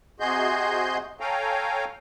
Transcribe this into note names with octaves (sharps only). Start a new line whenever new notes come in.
C3 F#4 G#4 D#5 C6 G6
A4 C#5 F5 G5 G#5 A#5